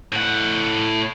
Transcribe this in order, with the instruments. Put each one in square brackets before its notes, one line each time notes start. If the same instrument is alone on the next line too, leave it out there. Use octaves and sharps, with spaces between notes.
[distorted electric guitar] A2 F#5